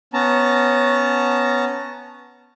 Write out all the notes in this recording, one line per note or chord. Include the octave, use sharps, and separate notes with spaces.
B3 C#4 A5 A#5